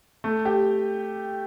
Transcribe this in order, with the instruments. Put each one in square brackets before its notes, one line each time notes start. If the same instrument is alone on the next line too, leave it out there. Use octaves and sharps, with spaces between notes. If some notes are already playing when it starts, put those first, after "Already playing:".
[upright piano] A3
G4